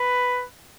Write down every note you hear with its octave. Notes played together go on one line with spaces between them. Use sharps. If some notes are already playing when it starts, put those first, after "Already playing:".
Already playing: B4